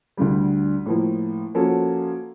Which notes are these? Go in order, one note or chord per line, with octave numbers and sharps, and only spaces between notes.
D2 D3 G3
A2 F3 A#3
F3 A#3 C#4 F#4 A4